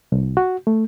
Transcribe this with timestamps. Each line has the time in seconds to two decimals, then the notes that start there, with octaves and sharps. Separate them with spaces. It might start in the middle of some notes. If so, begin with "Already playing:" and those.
0.12 C2
0.37 F#4
0.67 A3